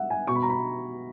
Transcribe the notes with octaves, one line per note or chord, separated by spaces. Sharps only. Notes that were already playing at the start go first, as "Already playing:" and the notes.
Already playing: E5 F#5
G#5
B2 C#6
B5
A#5
B5